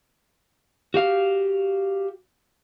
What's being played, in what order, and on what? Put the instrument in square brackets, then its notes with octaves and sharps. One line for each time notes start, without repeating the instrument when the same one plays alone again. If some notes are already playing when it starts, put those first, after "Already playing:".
[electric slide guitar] F#4 G4 F5